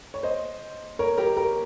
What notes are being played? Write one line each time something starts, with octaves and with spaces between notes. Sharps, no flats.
C#5
C5 D#5
A#4 C#5
G4 A#4
G4 A#4